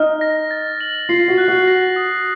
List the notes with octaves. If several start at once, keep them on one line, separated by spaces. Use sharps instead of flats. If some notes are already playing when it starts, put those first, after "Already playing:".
Already playing: D#4 F6
A#6
A6
F#7
F4 C7
F#4
F#6
F#4
A#6
D#6